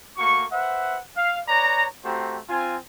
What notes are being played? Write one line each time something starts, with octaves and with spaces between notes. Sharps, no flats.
A3 A#3 F#4 C#6
B4 C5 E5 F#5
F5
B4 C#5 D5 A#5
A3 C4 F#4 G4 C5 A#5
C4 F4 G#5